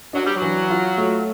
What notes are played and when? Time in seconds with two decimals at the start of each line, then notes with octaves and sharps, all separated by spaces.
0.13 F#3 D4
0.25 G3
0.35 F#3
0.41 E3
0.70 F4
0.98 A3